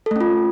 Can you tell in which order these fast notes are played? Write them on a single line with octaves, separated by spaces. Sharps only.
A4 A3 C#4 F4